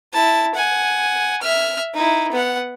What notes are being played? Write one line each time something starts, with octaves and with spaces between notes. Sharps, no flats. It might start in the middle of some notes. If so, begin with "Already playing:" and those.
E4 A5
F#5 G#5
E5 F6
D#4 E4
B3 F#5